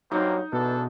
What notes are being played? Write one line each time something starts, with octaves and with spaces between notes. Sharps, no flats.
G2 F#3 A#3 C4 D#4
E2 B2 B3 D4 A4